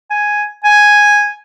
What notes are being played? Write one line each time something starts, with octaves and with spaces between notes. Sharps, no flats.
G#5
G#5